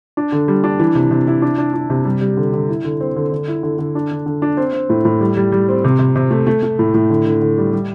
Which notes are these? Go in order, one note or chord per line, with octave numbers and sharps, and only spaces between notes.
D4
D3
G3
D4
E3
C3
C3
E4
D4
D4
D4
C3
G3
G3
D3
D3
E4
D3
C4
D3
D3
E4
D3
D3
D4
D3
D3
D4
C4
C4
A2
A2
G3
G3
G3
C4
C3
C3
C3
A3
A3
A3
A2
A2
D3
D3
D3
G3
G3